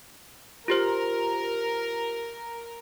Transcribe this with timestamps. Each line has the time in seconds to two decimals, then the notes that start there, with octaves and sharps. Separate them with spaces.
0.68 F4 G4 A#4 C5